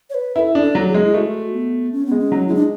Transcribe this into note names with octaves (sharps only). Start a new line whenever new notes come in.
C#5
B4
E4 A4 B4
D4
A4
F#3 A4
G#4
G#3
E4
A3 F#4 G#4
B3
C#4
B3
G#3
C#4
F#3
E4
G#3 D4